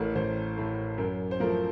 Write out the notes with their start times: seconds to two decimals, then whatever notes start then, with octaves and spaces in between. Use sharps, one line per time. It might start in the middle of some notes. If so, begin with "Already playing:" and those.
Already playing: A1 A2 A3 A4 A#4
0.15 A1 C5
0.57 A2 A3
0.98 F#2 A#4
1.31 C5
1.40 F3 A3 A#4